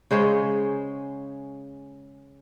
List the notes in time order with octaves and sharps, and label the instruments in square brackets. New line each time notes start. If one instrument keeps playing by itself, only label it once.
[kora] C#3 G#3 C5 C#5